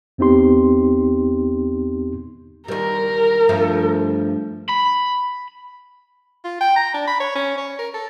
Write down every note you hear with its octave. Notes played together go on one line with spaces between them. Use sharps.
E2 B3 C4 D#4 G4 C6
D#2 G3 A#4
G2 F3 A3
B5
F4
G5
A#5
D4
B5
C#5
C#4
C#5
A#4
A4